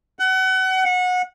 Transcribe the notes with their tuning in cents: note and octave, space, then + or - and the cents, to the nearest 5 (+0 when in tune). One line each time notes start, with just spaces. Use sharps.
F#5 +30
F#5 -25